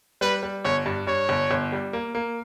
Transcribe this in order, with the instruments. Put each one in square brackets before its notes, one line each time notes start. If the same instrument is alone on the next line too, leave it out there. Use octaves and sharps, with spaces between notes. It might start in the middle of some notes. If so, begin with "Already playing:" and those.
[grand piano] G3 [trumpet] B4
[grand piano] G3
[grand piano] G1 [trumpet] C#5
[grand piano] G2
[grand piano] G2 [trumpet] C#5
[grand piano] G1
G1
G3
A#3
A#3